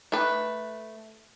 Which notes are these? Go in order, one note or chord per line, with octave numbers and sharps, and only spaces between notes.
A3 B4